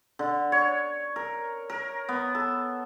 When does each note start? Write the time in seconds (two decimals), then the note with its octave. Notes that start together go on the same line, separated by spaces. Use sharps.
0.19 D3
0.52 C#5
1.16 A#4
1.70 A#4
2.09 B3
2.35 A4